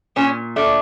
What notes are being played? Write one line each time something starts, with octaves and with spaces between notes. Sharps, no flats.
A#2 C#4
A3 D4